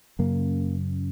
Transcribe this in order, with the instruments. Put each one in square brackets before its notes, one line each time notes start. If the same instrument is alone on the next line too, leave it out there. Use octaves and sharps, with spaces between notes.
[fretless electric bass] F#2 C#3 A#3